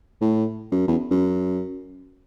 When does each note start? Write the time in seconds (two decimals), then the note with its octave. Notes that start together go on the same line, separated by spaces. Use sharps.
0.21 A2
0.72 F#2
0.88 E2
1.11 F#2